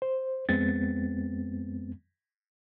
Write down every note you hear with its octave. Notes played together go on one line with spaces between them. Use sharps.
C5
F2 G#3 B3 C4 A6